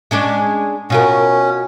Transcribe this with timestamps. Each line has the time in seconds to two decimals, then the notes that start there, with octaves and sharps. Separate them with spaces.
0.11 G#3 C#4 D4
0.90 B2 C#4 F4 A#4